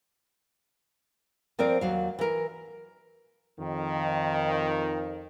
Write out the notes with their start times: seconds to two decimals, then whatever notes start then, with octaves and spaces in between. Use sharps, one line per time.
1.59 F3 C4 A#4 C5 D5
1.81 D#2 F#3 F5
2.19 E3 A#4
3.59 F2 D#3